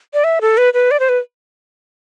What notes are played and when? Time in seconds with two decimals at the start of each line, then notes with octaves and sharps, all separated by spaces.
0.14 D5
0.24 E5
0.41 A4
0.57 B4
0.74 B4
0.91 D5
1.00 C5
1.09 B4